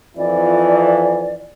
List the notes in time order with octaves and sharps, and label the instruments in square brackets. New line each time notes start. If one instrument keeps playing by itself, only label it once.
[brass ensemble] F2 E3 [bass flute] D5